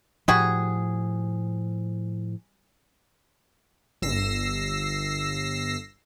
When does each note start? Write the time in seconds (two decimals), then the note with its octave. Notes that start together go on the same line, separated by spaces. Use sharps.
0.28 A2 F3 G3 F#4 G#4
4.02 G1 E6 A#6 C7